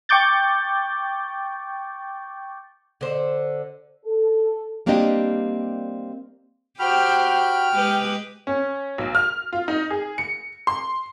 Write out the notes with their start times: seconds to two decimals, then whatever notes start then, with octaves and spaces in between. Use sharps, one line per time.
0.09 G5 C#6 D6 G6 A6
3.01 D3 C5
4.05 A4
4.86 G3 A#3 C4 D4 G4 D#5
6.79 F#4 G4 C5 G5 B5 F6
7.73 G#3 G4 B4
8.47 C#4
8.98 B1
9.15 F6
9.53 F4
9.68 D#4
9.90 G#4
10.18 C#7
10.67 C6